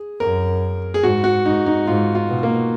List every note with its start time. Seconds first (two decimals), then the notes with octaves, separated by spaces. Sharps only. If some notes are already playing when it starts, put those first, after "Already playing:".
Already playing: G#4
0.20 F#2 A#4
0.94 G#4
1.03 G#2 F#4
1.24 F#4
1.45 G#2 D#4
1.66 D#4
1.87 G#2 F4
2.15 F4
2.28 B2
2.43 A#3